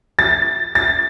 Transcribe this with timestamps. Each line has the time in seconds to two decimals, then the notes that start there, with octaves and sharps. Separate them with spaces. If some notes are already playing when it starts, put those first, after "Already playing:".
0.19 A6
0.75 A6